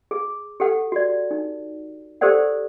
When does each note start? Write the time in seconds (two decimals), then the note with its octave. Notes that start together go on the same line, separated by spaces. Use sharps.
0.11 G#4
0.60 G4 A4 F#5
0.92 F#4 D5
1.31 D#4
2.21 G4 A4 A#4 C5 D5 F#5